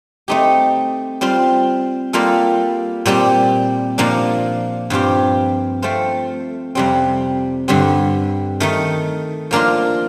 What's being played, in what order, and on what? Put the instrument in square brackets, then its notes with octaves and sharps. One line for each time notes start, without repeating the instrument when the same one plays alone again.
[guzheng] A3 C4 D#4 G4
G3 C4 F4 C5
G3 A#3 F4 A4
A#2 G3 C4 G4
A#2 F3 A#3 D4
G2 F3 C4 G4
A3 C4 F4 C5
F2 C3 G3 C4
G2 D3 G3 C4
D#3 A3 D#4
F3 A#3 D4 F4 A#4